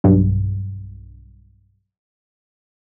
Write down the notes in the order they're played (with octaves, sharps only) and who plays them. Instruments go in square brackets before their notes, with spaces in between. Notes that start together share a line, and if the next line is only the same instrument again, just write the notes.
[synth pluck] B1 G2